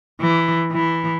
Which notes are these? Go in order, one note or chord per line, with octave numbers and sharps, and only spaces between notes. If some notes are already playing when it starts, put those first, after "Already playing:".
E3
E3